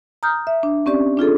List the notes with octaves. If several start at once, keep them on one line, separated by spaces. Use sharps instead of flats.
A#5 D#6 F6 G6
E5
D4
C4 C#4 G4 D5
D4 F4 G#4 A4